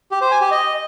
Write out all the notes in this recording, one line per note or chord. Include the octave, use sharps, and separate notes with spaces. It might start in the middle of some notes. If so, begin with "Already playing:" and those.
G4
C5
G#5
G4
D#5